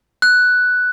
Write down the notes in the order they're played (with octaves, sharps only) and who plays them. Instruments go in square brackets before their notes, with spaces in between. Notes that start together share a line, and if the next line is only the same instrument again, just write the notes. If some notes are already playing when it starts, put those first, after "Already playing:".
[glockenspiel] F#6